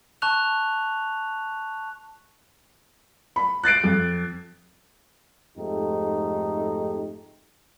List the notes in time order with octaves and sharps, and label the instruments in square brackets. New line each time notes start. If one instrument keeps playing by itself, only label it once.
[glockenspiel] A5 C#6 F#6 F7
[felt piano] B5
F#6 A6 C7 D7
F2
[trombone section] F2 G#2 A3 D#4 G4